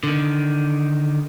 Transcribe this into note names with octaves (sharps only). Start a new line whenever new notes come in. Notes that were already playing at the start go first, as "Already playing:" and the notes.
D3 D#3